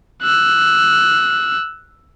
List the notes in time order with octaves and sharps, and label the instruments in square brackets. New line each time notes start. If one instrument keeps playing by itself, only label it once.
[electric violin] E6 F#6